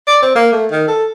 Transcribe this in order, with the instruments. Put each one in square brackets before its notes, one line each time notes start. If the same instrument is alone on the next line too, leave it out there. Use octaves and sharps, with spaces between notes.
[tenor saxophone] D5
C4
A#3
A3
D#3
A4